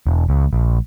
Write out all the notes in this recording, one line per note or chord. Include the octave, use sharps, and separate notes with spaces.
E1
C#2
A#1